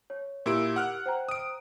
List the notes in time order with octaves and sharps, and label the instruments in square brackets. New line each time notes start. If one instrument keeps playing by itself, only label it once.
[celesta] C#5
[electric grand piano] A#2 E4 D7 [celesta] G4 A#4 E6
[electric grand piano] F#5 F6 F#6
[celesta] C5 G5 A#5
[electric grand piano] D#6 D7